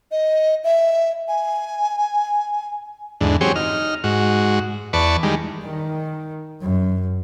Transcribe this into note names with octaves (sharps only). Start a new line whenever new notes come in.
D#5
E5
G#5
E2 G#2 D3
F#3 C4 G4 G#4 C#5
D#4 F6
G#2 F#4
E2 B4 D5 A5 C#6
D#3 G3 G#3
D#3
F#2